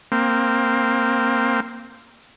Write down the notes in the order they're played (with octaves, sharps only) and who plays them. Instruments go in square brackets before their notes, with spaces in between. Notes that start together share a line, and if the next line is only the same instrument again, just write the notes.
[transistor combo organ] A#3 C4